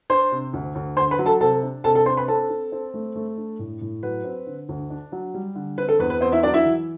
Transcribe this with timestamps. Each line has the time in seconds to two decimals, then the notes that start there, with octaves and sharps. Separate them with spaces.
0.10 D4 C5 C6
0.32 C3
0.53 D2
0.75 D2
0.97 D3 C5 C6
1.11 B4 B5
1.19 F#3
1.26 A4 A5
1.41 C3 A4 A5
1.63 D4
1.84 C3 A4 A5
1.95 A4 A5
2.06 D4 C5 C6
2.17 B4 B5
2.28 C4 A4 A5
2.50 C4
2.72 C4
2.94 A3
3.16 A3
3.37 D4
3.59 A2
3.81 A2
4.03 F#3 B4
4.24 C4
4.46 D3
4.69 D2
4.90 D4
5.12 F#3
5.34 G3
5.55 D3
5.78 C4 B4
5.88 A4
5.99 E2 B4
6.10 B4
6.21 B3 C4 C5
6.32 E4 E5
6.43 F#3 D4 D5
6.54 E4 E5
6.65 E3